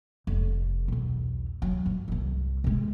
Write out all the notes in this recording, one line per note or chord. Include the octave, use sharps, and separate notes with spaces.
F1
B1 E2
F#3
G2
E1 C2
C3 G#3